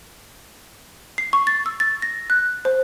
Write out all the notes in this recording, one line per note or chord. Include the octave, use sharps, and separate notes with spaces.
C7
C#6
A6
E6
A6
A#6
F#6
C5